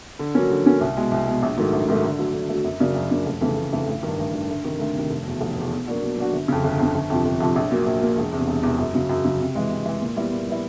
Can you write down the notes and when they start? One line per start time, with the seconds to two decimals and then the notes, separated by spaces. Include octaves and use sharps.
0.19 D3
0.35 F#3 A#3 C#4
0.50 D3
0.65 F#3 A#3 C#4
0.81 C2
0.96 B2 G#3
1.11 C2
1.27 B2 G#3
1.42 A#1
1.57 G#2 D#3 F#3 A3
1.73 A#1
1.88 G#2 D#3 F#3 A3
2.03 D3
2.19 F#3 A3
2.34 D3
2.50 F#3 A3
2.64 F#2
2.80 C#3 F#3 A#3 D4
2.95 F#2
3.10 C#3 F#3 A#3 D4
3.26 F1
3.41 F2 C#3 E3 A3
3.57 F1
3.72 F2 C#3 E3 A3
3.88 A1
4.03 G2 D#3
4.19 A1
4.34 G2 D#3
4.49 D2
4.64 C3 D#3
4.79 D2
4.95 C3 D#3
5.10 F1
5.25 E2 B2
5.41 F1
5.56 E2 B2
5.72 B2
5.87 F#3 A#3 D4 F#4
6.02 B2
6.17 F#3 A#3 D4 F#4
6.33 G1
6.48 F2 C#3
6.64 G1
6.79 F2 C#3
6.95 G1
7.10 F2 C3 F3
7.25 G1
7.40 F2 C3 F3
7.56 A#1
7.71 A#2 F#3 A#3
7.86 A#1
8.02 A#2 F#3 A#3
8.17 E1
8.32 E2 C3
8.48 E1
8.63 E2 C3
8.78 F#2
8.94 C#3 F#3
9.09 F#2
9.25 C#3 F#3
9.40 C3
9.55 E3 G#3
9.70 C3
9.86 E3 G#3
10.01 A#2
10.16 G3 B3 E4
10.32 A#2
10.47 G3 B3 E4